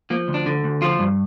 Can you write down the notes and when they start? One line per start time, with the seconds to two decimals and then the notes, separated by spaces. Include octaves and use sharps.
0.10 F3 A#3
0.28 D2
0.34 D4
0.46 D3
0.64 D2
0.82 F3 F4
0.99 G2